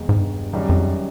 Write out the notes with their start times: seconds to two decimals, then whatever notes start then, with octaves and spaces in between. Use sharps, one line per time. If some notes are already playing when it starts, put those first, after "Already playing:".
Already playing: E1 D#2 G#3
0.09 G#2
0.19 G2
0.52 F#1 F#2 D#3 G3
0.69 F2